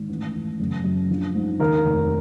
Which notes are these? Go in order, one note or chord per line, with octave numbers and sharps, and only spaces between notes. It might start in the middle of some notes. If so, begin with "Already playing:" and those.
Already playing: G#1
A1
A1
F#1
F#2
A#1
G#2
D#2 A#4
F1